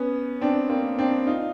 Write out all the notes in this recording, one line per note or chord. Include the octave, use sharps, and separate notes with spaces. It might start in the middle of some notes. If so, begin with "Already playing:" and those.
Already playing: B3 C#4
C4 D4
A#3 C4
C4 D4
D#4 F4